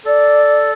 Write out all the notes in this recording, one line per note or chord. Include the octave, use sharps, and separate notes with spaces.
A4 D5